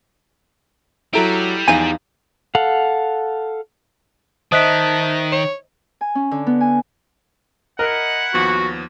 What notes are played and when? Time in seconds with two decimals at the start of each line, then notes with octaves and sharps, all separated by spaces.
1.13 F#3 G3 E4 A4 A#5 D7
1.68 E2 F3 D#4 F5 G#5 D#7
2.55 A4 F5 F#5
4.52 D#3 C5 D#5 E5 A5 D#6 F#6 B6
5.32 C#5
6.01 G#5
6.15 C#4
6.31 D3
6.47 B3
6.61 G#5
7.79 E4 A#4 D#5 F#5
8.34 D#2 F3 B3 F#4